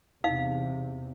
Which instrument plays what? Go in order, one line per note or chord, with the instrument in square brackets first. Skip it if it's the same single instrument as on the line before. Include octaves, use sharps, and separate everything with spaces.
[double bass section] E2 C3 [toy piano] D#4 F5